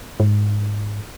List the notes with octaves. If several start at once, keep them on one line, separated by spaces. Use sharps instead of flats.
G#2